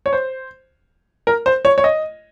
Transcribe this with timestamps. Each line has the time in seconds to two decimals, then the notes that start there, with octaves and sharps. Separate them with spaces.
0.06 C#5
0.13 C5
1.27 A#4
1.46 C5
1.65 C#5
1.78 C#5
1.84 D#5